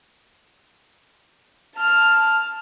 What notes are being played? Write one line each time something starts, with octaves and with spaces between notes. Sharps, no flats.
A5 F6